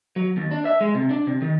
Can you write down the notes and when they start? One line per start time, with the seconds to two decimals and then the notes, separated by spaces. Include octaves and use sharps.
0.16 F#3
0.37 D#2
0.51 D4
0.65 E5
0.81 G#3
0.95 C3
1.10 D4
1.27 C3
1.42 D#3